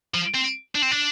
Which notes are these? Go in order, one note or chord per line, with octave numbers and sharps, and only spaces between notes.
F3
C4
D4
C4
D4